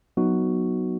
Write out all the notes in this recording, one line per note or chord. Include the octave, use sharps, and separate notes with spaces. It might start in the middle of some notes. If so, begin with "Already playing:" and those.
F#3 B3 D#4 F#4